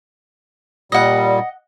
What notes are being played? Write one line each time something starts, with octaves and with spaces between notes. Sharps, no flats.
A#2 G3 D#5 F#5